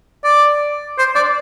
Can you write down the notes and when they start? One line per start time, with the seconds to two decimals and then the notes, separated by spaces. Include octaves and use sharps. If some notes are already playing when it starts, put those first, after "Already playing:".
0.24 D5
0.98 C5
1.15 D5